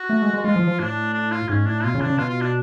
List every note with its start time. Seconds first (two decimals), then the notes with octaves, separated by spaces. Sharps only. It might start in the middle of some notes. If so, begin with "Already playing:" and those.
Already playing: F#4
0.09 A3
0.22 G#3
0.34 G#3
0.44 G#3 F4
0.56 F3
0.67 F3
0.79 A2 D4
1.14 D4
1.32 F4
1.49 G#2 C#4
1.66 A2 D4
1.83 B2 F4
1.94 C#3
2.01 D4
2.06 C#3
2.18 B2 F4
2.29 F4
2.41 D4